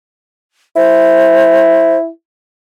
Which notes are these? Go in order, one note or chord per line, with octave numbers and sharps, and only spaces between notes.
E4 C5